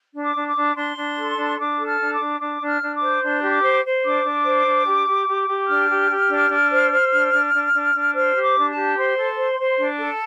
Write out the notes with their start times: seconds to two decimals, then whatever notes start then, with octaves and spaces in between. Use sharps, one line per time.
0.13 D4
0.20 D6
0.35 D4
0.48 D6
0.54 D4
0.75 D4 C6
0.95 D4
1.17 A4
1.37 D4
1.58 D4 D6
1.77 A4
1.85 F6
1.99 D4
2.12 D6
2.19 D4
2.39 D4 D6
2.61 D4
2.66 F6
2.81 D4
2.95 D6
3.02 C5
3.21 D4 C6
3.42 G4
3.49 D6
3.62 C5
3.83 C5
4.04 D4 D6
4.24 D4
4.44 C5
4.65 D4
4.86 G4
5.07 G4
5.27 G4
5.47 G4
5.68 D4 F6
5.89 G4
6.10 G4
6.29 D4
6.50 D4
6.71 C5
6.91 C5
7.11 D4
7.32 D4
7.53 D4
7.74 D4
7.93 D4
8.14 C5 F6
8.35 G4
8.41 D6
8.56 D4
8.69 A5
8.76 G4
8.97 C5 C6
9.17 A4
9.37 C5
9.58 C5
9.79 D4
9.99 A4